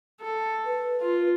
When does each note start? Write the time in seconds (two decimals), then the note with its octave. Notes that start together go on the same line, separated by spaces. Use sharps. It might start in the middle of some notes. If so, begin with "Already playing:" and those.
0.21 A4
0.66 B4
1.01 F4